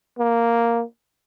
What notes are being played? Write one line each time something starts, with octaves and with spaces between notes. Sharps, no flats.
A#3